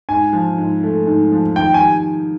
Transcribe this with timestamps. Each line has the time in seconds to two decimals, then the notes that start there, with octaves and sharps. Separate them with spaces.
0.09 G#2 G#5
0.33 F3
0.58 G#2
0.83 A3
1.07 G#2
1.32 F3
1.56 D#3 G5
1.74 G#5
1.81 G3